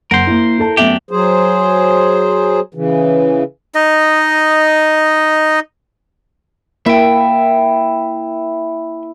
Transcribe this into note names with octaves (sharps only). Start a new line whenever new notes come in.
F#1 A#4 C5 F#5
A#3 E4
E4 A4 A5
F#2 A3 B3 D4 G4 E5
F#3 G#4 C5
C#3 E3
D#4 D#5
A#3 E4 E5 G5